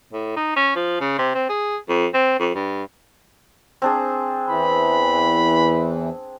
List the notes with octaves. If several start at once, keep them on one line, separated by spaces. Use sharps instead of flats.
A2
D#4
C#4
F3
C#3
C3
C4
G#4
F2
C4
F2
G2
C4 D4 G#4
E2 E3 B5